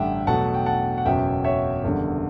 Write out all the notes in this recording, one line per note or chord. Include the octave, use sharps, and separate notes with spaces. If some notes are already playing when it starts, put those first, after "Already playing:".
Already playing: A1 G2 D3 G3 E5 F#5 G5
E2 B2 F#3 A3 F#5 A5
G5
F#5 A5
F#5
F#1 E2 B2 F#3 C#4 E5 G5
C#5 E5
F#1 E2 D3 G3